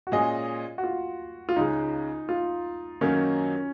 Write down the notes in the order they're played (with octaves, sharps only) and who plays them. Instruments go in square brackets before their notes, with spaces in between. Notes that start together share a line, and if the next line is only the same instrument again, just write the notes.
[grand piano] F#4
[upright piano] A#2 G#3 C#4 G#4 D#5 [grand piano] F4
[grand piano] F#4
F4
F4
[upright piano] C#2 C#3 G#3 [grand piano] D#4
[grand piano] F4
[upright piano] F#2 D#3 F#3 A#3 D#4 [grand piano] C#4